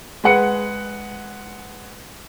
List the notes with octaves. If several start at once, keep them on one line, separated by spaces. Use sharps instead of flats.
G#3 B4 F#5 C#7